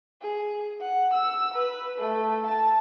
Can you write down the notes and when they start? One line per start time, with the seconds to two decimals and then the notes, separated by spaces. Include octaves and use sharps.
0.22 G#4
0.81 F#5
1.14 E6
1.54 B4
1.98 A3
2.46 A5